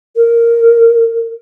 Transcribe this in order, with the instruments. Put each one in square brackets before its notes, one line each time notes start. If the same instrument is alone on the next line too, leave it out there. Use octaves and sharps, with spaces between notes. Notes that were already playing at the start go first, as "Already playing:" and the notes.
[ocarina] A#4